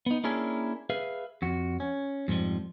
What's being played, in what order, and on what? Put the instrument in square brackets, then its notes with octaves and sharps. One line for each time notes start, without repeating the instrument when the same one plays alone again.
[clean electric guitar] B3 D#4
A#3 C#4 D4 E4 G#4 A#4
G#4 B4 E5 F5
F2 F#4
C#4
F2 G#2 D#3 F3 G3